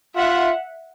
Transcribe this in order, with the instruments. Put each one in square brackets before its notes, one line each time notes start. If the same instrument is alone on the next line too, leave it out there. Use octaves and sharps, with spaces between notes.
[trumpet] F4 [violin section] E5 F#5